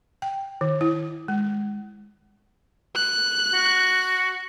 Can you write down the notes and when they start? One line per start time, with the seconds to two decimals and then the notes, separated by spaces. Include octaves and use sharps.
0.22 G5
0.61 D#3
0.81 E4
1.28 G#3
2.96 F#6
3.53 F#4